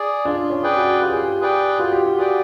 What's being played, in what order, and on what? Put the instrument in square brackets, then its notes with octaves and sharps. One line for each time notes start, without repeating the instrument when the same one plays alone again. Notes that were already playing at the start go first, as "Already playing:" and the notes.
Already playing: [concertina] G#4 D5
[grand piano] D4 [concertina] F4
[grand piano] C#4
[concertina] G#4 B4 D5 G5
[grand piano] F#4
[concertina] F4 [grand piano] G4
[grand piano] G#4
G4
[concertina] G#4 B4 D5 G5
[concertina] F4 [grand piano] F#4
[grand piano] G4
F#4
[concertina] G#4 B4 D5 G5